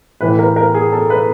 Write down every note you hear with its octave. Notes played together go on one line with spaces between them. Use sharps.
A2 E3 B4
A#4
A#4
G#4
A4
B4